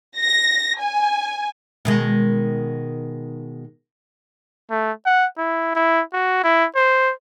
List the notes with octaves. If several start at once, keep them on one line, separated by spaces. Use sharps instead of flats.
A#6
G#5
B2 D#3 G#3
A3
F#5
E4
E4
F#4
E4
C5